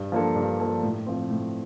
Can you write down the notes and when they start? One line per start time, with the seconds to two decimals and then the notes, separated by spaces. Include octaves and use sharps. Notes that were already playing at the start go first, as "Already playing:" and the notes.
Already playing: G2
0.12 F3 A#3 D4 A4
0.36 G2
0.60 F3 A#3 D4 A4
0.83 A2
1.06 F3 C4
1.30 A2